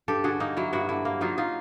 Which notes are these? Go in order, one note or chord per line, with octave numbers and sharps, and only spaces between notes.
G2 G4 A4
D3 F#4 G#4
A#3 D#4
F#3 E4
G2 E4 F#4
D3 E4
A#3
F#3 D#4 F4
D#4 F4